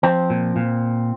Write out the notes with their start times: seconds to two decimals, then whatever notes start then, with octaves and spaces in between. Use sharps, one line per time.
0.03 F3 C4
0.30 A#2
0.56 A#2